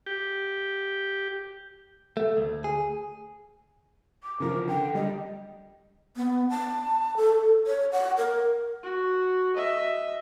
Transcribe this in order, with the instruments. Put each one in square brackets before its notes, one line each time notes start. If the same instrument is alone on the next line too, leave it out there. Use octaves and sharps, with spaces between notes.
[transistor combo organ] G4
[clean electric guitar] A3
D2
G#4
[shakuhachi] D6
[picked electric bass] C#3 E3 F3 [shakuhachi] A#4
[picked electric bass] D3 [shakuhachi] G5
[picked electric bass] G3 [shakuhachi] D#5
[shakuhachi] B3
A5
A4
C#5
F#5
A#4
[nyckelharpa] F#4
D#5 E5